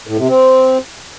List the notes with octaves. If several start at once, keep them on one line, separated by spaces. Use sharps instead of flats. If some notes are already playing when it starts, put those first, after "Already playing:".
A2
C3
C4